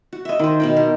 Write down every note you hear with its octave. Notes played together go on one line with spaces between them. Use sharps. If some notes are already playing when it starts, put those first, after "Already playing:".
F#4
D#5 E5
D#3 C5
B2 D#3 G5
A#4